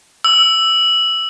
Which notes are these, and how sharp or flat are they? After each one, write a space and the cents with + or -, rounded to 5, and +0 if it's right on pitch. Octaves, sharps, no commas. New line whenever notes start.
E6 +5